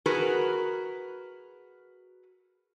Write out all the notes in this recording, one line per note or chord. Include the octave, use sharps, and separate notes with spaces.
F#4 G#4 A#4 B4